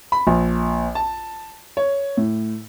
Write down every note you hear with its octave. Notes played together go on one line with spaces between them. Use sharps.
B5
A#1
A5
C#5
A2